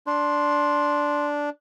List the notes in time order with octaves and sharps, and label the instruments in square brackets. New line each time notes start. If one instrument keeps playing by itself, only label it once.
[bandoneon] D4 [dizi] C6